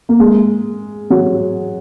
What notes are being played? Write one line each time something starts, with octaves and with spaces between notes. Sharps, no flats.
A#3
G#3
F#3